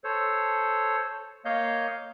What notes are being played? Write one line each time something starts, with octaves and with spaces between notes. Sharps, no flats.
A4 C5 C#5
A#3 C#5 D#5 F5 G6